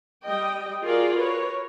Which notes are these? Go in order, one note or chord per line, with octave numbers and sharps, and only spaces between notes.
G3 D#5 G5
F4 F#4 G#4 A#4 D5
A#4 B4 C#5